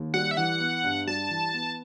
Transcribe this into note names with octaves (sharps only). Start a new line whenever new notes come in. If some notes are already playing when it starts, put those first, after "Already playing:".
Already playing: D#2
G3 F#5
E5
E3 F#5
B3
G2
G3 A5
E3
B3